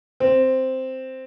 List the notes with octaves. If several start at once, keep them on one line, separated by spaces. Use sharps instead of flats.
C4